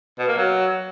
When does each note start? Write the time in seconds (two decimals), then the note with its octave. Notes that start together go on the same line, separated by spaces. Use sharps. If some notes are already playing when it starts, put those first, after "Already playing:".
0.19 B2
0.28 A#3
0.37 F#3